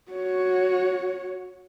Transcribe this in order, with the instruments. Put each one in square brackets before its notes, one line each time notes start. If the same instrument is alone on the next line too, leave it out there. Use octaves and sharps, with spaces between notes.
[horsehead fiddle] F#4 C#5